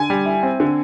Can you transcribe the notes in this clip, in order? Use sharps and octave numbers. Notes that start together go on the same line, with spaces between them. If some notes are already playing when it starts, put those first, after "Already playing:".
Already playing: D3 G#5
G3
E4
C4
D3